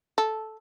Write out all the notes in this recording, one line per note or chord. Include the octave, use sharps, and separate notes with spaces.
A4